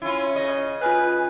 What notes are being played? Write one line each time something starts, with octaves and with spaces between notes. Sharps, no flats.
C#4 E4 F4
C#3 D#5
F4 B4 G#5 F6 F#6